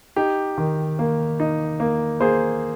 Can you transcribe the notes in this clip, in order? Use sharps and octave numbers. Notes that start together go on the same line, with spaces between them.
D#4 G4
D#3
A#3
D#4
A#3
A#3 G#4 C5